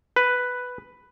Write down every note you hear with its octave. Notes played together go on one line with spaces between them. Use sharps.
B4